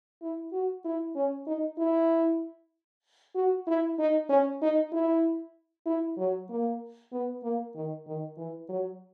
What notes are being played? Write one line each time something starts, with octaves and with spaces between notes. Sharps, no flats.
E4
F#4
E4
C#4
D#4
E4
F#4
E4
D#4
C#4
D#4
E4
E4
F#3
A#3
B3
A#3
D#3
D#3
E3
F#3